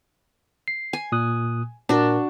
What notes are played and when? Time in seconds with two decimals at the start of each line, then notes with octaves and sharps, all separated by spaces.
0.68 C7
0.93 G#5
1.12 A#2 D#6 F#6
1.89 A#2 D4 F#4 A#4